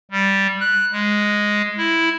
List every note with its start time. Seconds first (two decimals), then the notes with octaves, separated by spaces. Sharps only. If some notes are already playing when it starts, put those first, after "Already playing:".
0.11 G3
0.61 F#6
0.93 G#3
1.77 E4